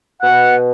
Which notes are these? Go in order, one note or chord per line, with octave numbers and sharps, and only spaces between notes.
B2 F#5